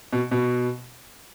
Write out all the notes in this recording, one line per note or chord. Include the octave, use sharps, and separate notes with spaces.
B2
B2